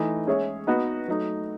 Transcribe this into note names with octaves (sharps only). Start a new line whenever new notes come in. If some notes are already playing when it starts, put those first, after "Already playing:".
Already playing: E3 A3 D#4
G#3 C#4 G#4 C#5 E5
B3 D#4 F#4 B4 D#5
F#3 A3 D#4